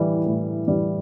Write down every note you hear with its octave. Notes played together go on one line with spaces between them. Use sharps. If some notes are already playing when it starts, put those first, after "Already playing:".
Already playing: A2 E3 G3
A2
E3 G3